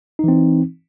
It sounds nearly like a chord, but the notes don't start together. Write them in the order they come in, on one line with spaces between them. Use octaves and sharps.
D#4 E3 C4